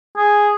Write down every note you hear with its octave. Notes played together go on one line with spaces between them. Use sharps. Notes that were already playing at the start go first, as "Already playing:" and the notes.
G#4